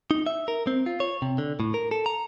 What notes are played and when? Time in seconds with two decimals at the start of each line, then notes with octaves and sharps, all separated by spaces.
0.11 D#4
0.26 E5
0.48 A#4
0.67 C4
0.86 F4
1.00 C#5
1.22 C3
1.38 D3
1.60 A2
1.74 A#4
1.91 A4
2.06 A#5